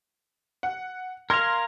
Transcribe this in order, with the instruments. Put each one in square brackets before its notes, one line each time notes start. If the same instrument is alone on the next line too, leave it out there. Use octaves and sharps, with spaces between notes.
[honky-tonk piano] F#5
[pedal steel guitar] A#4 F5 [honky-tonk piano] C6 G#6 A#6